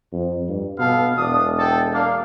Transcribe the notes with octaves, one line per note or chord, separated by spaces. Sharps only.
F2
G2
B2 B3 A4 F5
E1 D4 D#6
A4 G5 A5
A#3 D4 F5